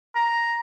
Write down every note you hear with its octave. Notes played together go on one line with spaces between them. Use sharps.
A#5